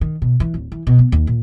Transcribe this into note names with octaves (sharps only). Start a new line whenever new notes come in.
D#3
B2
E3
D1
E3
B2
B3
D#2
A#2